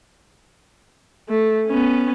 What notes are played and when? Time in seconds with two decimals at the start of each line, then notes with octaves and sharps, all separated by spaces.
1.29 A3
1.67 B3 C#4